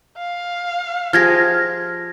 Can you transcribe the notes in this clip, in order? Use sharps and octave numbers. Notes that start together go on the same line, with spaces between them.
F5
F3 G4 G#4 F6 G#6 A#6